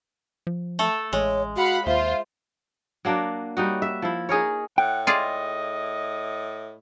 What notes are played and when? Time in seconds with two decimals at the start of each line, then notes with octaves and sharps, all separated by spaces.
0.47 F3
0.79 A3 A4
1.13 A1 G#3 C#5
1.56 F#4 F5 F#5 B5
1.86 D#2 F4 C5 E5
3.05 F#3 A#3 D4
3.57 G3 D#4 F#4
3.82 E5
4.02 F3 E4
4.29 D#4 G#4 A#4 C#5
4.78 A2 F#5 G5
5.07 F4 G#4 D5 D#5